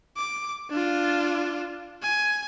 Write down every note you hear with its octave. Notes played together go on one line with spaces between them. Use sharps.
D6
D4 F4
G#5